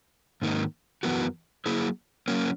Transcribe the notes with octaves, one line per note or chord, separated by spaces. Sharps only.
G#2 D#3 A#3 D#4
F#2 E3 B3 F#4 A#4
F#3 A#3 E4 G#4
F#3 A#3 C#4